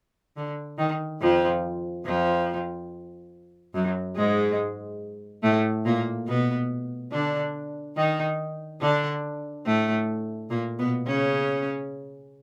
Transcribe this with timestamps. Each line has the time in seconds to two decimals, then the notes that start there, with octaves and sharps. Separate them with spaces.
0.36 D3
0.78 D#3
1.21 F2 F3
2.05 F2 F3
3.74 F#2 F#3
4.16 G#2 G#3
5.43 A2 A3
5.85 A#2 A#3
6.27 B2 B3
7.12 D3 D4
7.96 D#3 D#4
8.81 D3 D4
9.66 A2 A3
10.50 A#2 A#3
10.79 B2 B3
11.06 C#3 C#4